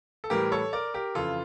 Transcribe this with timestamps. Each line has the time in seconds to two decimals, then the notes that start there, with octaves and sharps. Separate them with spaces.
0.24 A4
0.30 A2 E3 G3 G4 A#4
0.52 A4 C#5
0.73 A#4 D5
0.94 G4 A#4
1.15 F2 C#3 E3 F4 A4